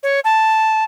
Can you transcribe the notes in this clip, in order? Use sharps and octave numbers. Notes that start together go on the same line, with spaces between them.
C#5
A5